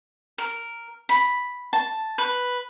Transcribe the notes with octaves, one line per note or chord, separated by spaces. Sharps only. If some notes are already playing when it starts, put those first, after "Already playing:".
A#4
B5
A5
B4